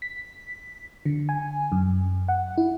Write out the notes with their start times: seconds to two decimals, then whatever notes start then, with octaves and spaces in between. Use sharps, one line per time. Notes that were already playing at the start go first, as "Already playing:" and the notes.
0.02 B6
1.05 D3
1.29 G#5
1.72 F#2
2.28 F#5
2.57 E4